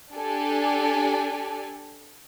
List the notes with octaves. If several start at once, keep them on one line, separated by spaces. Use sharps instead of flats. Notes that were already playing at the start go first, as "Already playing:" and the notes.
D4 G4 A4 D5 G#5